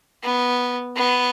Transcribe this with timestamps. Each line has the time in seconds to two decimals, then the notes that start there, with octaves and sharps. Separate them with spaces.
0.23 B3
0.96 B3